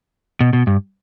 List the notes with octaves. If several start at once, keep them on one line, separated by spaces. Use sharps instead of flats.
B2
B2
G2